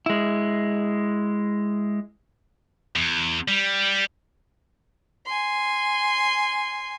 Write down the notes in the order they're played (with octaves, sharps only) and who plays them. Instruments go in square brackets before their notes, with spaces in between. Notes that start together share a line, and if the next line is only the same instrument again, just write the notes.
[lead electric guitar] G#3 E4
[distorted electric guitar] E2
G3
[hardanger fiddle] G#5 C6